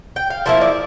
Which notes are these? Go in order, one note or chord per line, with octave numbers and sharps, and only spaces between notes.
G5
F5
F3 A#3 E4 E5
D5